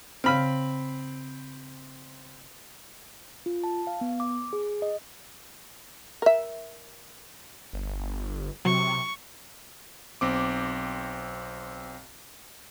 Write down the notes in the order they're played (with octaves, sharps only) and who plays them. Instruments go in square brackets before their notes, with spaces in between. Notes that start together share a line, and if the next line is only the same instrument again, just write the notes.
[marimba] C#3 F5 F6 [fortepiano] C4 B5
[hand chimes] F4
A5
F5
B3
D6
G#4
D#5
[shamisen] A#4 E5
[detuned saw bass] G1
[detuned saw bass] C3 [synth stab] F#3 [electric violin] C#6
[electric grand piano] B1 C4 D6